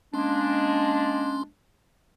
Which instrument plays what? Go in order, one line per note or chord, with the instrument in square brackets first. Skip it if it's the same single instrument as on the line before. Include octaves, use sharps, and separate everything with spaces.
[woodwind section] G#3 A#3 D4 [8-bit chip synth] C#4 C6